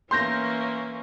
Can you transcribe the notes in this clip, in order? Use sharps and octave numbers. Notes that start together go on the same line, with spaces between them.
E3 A#3 C#4 C6 G6 A#6